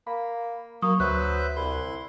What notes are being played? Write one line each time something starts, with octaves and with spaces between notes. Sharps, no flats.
A#3 B5
F#3 A#3 C#6 D#6
D2 F#3 B4 C5 E5 F#6
C2 E4 C6